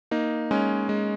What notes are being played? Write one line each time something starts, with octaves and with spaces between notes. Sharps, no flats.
A#3 D#4
G#3 C#4
G#3